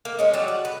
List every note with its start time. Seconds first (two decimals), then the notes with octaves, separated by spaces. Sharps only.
0.05 A#3
0.19 G#3 C#4 D#4
0.33 F#3 G3 D4
0.48 F#4
0.65 B4